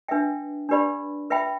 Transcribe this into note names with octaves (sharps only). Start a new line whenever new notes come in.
D4 B4 E5 G5
D4 G4 B4 D5 B5
B4 E5 G5 B5